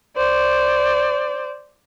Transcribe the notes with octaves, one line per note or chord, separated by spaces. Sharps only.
C5 D5